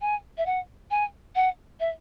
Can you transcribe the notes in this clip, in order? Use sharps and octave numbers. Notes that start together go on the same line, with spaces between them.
G#5
E5
F#5
G#5
F#5
E5